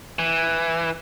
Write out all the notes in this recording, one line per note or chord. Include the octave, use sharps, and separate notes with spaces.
E3